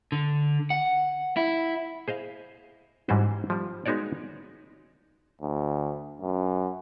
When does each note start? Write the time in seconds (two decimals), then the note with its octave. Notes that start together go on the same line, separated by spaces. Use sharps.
0.12 D3
0.70 F#5
1.37 E4
2.08 G#4 C5 D#5 F5
3.09 G#2 E3 G3 C#4 F#4 C5
3.50 F3 G3
3.86 G#3 B3 D#4 F#4 C#5 D5
5.41 D2
6.22 F#2